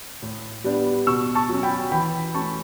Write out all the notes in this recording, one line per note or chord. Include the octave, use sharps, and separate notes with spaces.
A2
G3 B3 D4
B2 C#6 E6
A5 C#6
F#3 C#4
G5 B5
E3 G5 B5
A3 C#4 A5 C#6